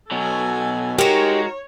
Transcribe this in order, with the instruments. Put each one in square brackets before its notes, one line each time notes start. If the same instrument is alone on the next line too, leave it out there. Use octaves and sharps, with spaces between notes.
[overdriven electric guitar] B2 F#3 [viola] A4 G#5
[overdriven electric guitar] G#3 [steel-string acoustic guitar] D#4 G4 [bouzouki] F#4 A#4 [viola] C#5